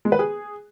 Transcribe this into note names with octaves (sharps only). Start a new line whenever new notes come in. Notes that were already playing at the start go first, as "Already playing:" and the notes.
G#3
B4
G#4